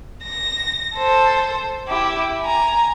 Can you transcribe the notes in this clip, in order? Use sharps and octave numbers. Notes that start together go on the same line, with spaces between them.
A#6
A4 C5
E4 G4
G#5 A#5